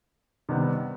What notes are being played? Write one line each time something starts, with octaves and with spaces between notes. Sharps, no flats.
C3 D#3 G3 B3